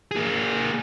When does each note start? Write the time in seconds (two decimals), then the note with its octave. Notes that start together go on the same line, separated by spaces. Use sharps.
0.11 A#3 G#4